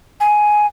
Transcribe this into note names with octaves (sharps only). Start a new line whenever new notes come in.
G#5